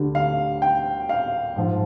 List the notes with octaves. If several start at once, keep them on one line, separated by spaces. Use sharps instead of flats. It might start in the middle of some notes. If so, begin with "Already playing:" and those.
Already playing: D2 D3 G3
F5
G5
F5
G#2 F3